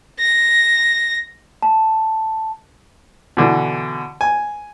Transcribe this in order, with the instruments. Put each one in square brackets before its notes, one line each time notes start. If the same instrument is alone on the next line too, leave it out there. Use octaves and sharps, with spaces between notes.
[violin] A#6
[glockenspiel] A5
[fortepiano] B2 D3 E3
G#5